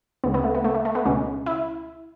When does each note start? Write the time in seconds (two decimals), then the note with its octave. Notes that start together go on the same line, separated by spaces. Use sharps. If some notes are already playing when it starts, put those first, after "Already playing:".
0.24 D2 C#3 G#3 B3
0.34 B3
0.44 A3
0.55 B3
0.64 A3
0.74 A3
0.85 A3
0.95 B3
1.06 C#2 B2 G#3 C#4
1.46 E4